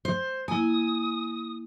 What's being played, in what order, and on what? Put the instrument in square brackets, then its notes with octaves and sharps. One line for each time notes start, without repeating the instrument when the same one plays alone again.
[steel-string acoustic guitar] C5
[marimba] A#3 E4 [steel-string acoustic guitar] G#5 [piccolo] D#6